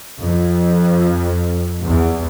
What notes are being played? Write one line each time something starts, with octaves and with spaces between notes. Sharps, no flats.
F2
E2